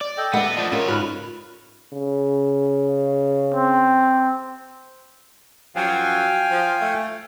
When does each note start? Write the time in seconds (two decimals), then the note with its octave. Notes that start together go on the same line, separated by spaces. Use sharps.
0.01 D5
0.18 A4 D#5 G5
0.33 A3 B3 D5 D#5 F#5
0.57 F3 D4
0.72 C#3 F4 A#4 C#5
0.88 G#2 F4 B4 B5 F#6
1.93 C#3
3.55 C4
5.76 F#2 F3 F#3 F5 G5 G#5
6.50 F3
6.80 A3